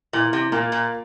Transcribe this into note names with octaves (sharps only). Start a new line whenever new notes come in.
A#2 E3
C3
A#2 A#3 F4 A#4
A#2